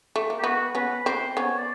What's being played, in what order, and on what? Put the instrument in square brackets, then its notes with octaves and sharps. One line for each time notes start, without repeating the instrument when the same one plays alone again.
[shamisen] A3
A#3
[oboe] G4
[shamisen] B3 [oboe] F#4
[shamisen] B3 C#4 [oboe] B4
[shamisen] C4 [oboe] C5
[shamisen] B3 C#4 [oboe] C#5
[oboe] D5